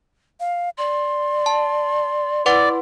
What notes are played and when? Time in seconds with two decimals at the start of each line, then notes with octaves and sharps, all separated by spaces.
0.40 F5
0.78 D5 C6
1.46 A5
2.46 E4 B4 D5 F#5